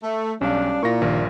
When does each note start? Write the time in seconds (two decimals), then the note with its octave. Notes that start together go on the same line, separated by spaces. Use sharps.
0.03 A3
0.41 B1 G3 C#4 D4 D5 F5
0.83 A#2 A#3 E4 A#4 C#6 A#6
1.02 A#1 G2 D#3 A#4